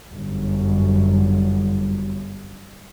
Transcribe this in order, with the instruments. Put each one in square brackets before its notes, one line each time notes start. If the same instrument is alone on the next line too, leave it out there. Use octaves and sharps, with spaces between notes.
[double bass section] G1 F#2